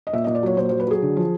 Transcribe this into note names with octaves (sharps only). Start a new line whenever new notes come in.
D#5
A#2 E5
D#5
A#2
D5
F#3 C#5
A#2 C5
F#3 C5
B4
F#3 G#4
D3
F3